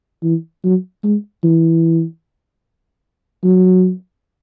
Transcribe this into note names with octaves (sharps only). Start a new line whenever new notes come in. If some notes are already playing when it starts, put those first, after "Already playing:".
E3
F#3
G#3
E3
F#3